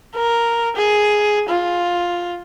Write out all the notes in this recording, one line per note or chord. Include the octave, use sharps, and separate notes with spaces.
A#4
G#4
F4